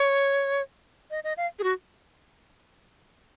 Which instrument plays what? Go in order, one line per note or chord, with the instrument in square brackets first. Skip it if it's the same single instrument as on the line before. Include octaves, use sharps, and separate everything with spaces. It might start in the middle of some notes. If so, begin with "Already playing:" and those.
Already playing: [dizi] C#5
D#5
D#5
F5
G#4
F#4